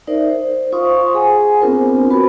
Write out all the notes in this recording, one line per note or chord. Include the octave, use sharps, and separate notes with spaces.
D#4 A#4 C5 D5 E5
C5
F4 C5 F5 C6 C#6 D#6
G#4 F#5 G#5
B3 C4 D4 F4 A#4 C5
F#4 A#4 B4 B5